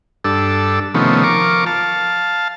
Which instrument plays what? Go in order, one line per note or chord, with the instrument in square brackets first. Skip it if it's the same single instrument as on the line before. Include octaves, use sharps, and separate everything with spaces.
[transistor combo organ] G2 D4 A4 E6
C3 D#3 F3 A3 B3 C#4
F3 A#4 C#6 D6
F5 A5